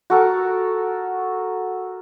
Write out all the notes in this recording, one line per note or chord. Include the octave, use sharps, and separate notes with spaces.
F#4 A4 A#4